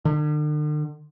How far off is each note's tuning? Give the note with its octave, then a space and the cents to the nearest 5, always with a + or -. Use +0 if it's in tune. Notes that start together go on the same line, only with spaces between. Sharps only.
D3 +45